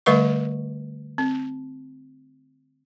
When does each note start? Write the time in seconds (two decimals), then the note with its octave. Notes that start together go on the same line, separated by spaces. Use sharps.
0.06 D3 G3 A3 B4 E5 C#6
1.18 C4